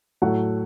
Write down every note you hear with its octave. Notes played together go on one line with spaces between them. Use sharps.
A2 F#3 A3 F#5